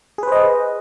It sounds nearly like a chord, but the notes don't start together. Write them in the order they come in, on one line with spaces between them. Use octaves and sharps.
G#4 B4 C5 D#5